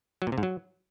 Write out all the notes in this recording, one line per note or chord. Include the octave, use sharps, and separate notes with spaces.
F#3
A#2
C3
G#2
F#3